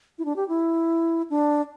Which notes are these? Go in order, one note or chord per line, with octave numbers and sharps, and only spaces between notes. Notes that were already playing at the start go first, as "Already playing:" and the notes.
E4
D4
G4
E4
D4